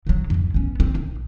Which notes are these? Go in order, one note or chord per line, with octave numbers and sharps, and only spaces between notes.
A#2 F#3
F2 G#2
B3 C#4
C4
A#1